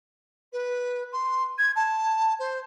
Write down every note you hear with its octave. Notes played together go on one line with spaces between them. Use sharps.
B4
C6
G#6
A5
C5